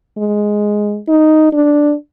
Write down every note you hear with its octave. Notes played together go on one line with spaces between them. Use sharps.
G#3
D#4
D4